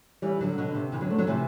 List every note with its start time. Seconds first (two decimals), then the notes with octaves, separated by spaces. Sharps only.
0.22 E3 G3
0.41 D3 F#3
0.58 B2 D3
0.75 C3
0.92 C3 E3
1.01 D3 F#3
1.10 A3 C4
1.18 D3 F#3
1.27 C3 E3